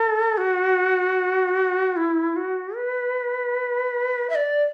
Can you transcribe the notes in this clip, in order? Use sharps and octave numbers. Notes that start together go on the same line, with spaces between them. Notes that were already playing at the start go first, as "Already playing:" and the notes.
Already playing: A4
F#4
E4
F#4
B4
E5
D5